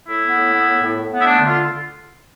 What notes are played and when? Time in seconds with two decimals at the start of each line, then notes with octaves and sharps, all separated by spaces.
0.08 A2 E4
0.22 B3
0.37 A2
0.52 B3
0.66 A2
0.81 A2
0.96 A2
1.11 B3
1.20 E4
1.26 A3 D4
1.40 D3
1.46 F4